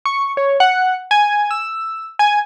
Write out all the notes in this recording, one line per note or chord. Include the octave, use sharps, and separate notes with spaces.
C#6
C#5
F#5
G#5
E6
G#5